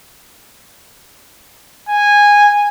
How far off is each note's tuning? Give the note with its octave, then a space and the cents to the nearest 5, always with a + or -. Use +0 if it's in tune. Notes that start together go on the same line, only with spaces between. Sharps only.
G#5 -10